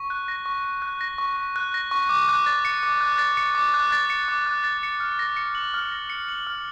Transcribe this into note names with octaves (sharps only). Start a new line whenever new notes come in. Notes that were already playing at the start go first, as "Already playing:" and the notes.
Already playing: C#6
F#6
A#6
C#6
C#6
F#6
A#6
C#6
C#6
F#6
A#6
C#6
D6
F#6
A6
C#7
D6
F#6
A6
C#7
D6
F#6
A6
C#7
D6
F#6
A6
C#7
F6
A#6
C#7
F#7
F6
A#6
C#7
F#7
F6